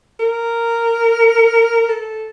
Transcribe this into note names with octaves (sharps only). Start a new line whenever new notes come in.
A#4
A4